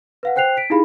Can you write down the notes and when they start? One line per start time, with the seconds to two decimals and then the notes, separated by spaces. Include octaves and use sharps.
0.23 B4 F5 F#5
0.36 C5 G5 F#6 C7 F7
0.57 B6 D7
0.70 D#4 E4 G4 G#4 F5 B5